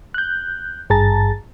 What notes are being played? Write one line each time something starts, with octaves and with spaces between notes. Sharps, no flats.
F#6 G6
G#1 G2 G#4 A5 A#5 A6